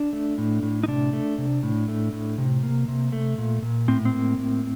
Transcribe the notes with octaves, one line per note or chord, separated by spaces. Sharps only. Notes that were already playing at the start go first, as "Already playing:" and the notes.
Already playing: D4
A3
A2
A2
D#4
C3 D4
A3
C3
A2
A3
A2
C3
A#3
C3
A3
A#2
A#2
A2 C4
C4
A#3
A2